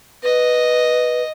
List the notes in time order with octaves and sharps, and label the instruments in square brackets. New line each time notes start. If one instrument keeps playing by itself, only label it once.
[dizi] B4 [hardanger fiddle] D#5